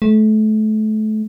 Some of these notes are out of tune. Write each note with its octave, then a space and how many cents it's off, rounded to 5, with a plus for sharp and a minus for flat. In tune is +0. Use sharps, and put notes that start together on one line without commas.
A3 -30